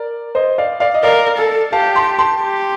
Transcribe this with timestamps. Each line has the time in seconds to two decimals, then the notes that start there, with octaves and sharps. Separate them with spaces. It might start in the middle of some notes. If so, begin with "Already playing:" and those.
Already playing: A#4 D5
0.35 C5 D#5
0.58 D5 F5
0.80 D5 F5
0.94 D#5
1.03 A#4 D5 F5
1.38 A4
1.72 G4 F5 A5
1.96 A5 C6
2.19 A5 C6
2.42 G4